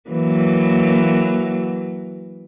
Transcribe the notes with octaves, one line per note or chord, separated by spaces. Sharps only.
E3 F#3 A#3